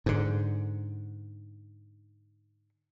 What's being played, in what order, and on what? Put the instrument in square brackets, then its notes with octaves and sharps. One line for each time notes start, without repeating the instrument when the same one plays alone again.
[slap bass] G#2 D3